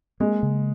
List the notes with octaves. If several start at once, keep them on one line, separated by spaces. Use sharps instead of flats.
G#3 A#3
C#3